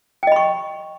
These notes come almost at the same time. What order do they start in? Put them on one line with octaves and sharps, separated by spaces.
G5 D#5 B5 C#6